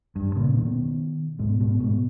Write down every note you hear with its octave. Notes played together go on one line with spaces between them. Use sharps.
G2
A#2 C#3
B2 D#3
G#2 B2
G#2 B2
G#2 B2